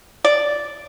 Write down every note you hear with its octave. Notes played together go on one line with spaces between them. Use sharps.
D5